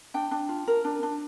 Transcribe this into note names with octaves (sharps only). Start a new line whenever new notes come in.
D4 G5
D4
F4
A#4
D4
D4